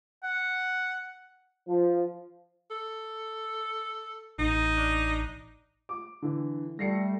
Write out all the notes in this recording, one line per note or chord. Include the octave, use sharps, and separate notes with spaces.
F#5
F3
A4
A1 D#4
D4
D6
D3 E3
G3 A3 A#6 C7 C#7